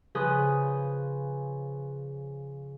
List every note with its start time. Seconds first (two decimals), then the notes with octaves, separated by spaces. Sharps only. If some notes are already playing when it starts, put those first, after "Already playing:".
0.15 C#3 F3 G#4 B4 D#6 F#6